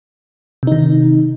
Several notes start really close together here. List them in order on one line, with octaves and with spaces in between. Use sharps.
C3 D#4 D#3